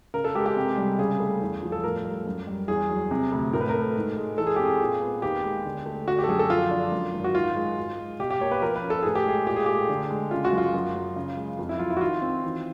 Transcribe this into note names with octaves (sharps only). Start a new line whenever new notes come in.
C#3 A#4
A4
G#3 G4
G4
C3
G3
C#3 G#4
A3
E2
F3
A4
A2 A#4
G3
F#2
G3
E2 G#4
F#3
C3
D2
A2 A#4
B4
A#4
A3
G#2
G#3
E3 A4
G#4
C4 G4
G#4
A#2
B3
D#2 G4
G#3
D3
A3
D3 F#4
G4
A4
F#2 G#4
A4
F3 F4
D4
F#2
G#1
F#4
G#2 F4
G#3
G#2
G#3
B2 G4
G4
A#3 C#5
B4
F3 A#4
B4
C#4
A4
A2 G#4
G4
G#3 G#4
A#2 G4
G#4
A3 G4
D3
G#3
C#3 F4
F#4
F#2
F4
F#2
F#3
C#3
G#3
F2
E4
F#3 F4
E4
F#4
D#3 F4
C4
E3